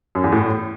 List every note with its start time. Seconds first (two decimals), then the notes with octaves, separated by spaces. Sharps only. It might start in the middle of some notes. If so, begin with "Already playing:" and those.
0.15 F#2
0.24 E2
0.32 A2